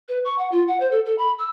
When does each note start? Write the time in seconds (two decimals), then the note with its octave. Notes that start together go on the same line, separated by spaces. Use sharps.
0.08 B4
0.24 C#6
0.38 F#5
0.51 F4
0.67 F#5
0.80 C5
0.91 A4
1.05 A4
1.18 B5
1.38 E6